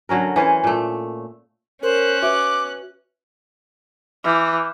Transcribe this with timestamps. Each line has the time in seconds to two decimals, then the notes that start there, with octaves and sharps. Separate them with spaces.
0.09 D3 F#3 C#4 A#4
0.36 E3 C#4 C5 C#5
0.64 A#2 A3
1.83 C#4 A#4 C5 F#6
2.23 F#4 B4 E5 D6
4.24 E3 D6 F6 G6